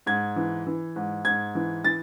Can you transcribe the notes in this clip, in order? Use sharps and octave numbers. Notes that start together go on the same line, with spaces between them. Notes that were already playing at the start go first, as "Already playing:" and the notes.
G#2 G#6
E3
E3
G#2
G#2 G#6
E3
E3 A6